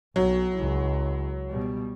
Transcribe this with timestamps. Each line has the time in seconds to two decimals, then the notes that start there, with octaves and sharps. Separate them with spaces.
0.16 B1 F#3
0.54 C#2 E4
1.50 B2 G3